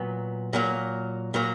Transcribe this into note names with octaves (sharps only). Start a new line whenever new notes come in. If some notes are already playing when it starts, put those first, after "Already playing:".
Already playing: A#2 F#3 B3
A#2 F#3 A#3
A#2 F#3 A#3